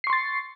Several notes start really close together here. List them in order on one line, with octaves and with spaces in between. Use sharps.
C7 C#6 C6 A6